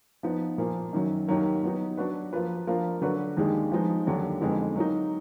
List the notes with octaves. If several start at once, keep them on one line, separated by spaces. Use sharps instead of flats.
F3 B3 D#4
A#2 F3 A#3
F#2 D#3 F#3
D#2 D#3 F#3 A#3
F#3 B3 D#4
F#3 D4 F#4 B4
F3 A#3 F4 B4
F3 A#3 D4 F4 A#4
D3 F#3 D4 F#4 B4
D#2 D#3 G#3 D4 G#4
F3 G#3 B3 D#4
D#2 D3 F#3 D4
F2 D3 G#3 B3 D#4
F#3 A#3 D#4